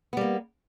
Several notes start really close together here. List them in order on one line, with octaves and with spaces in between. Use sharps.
B3 G3 A#3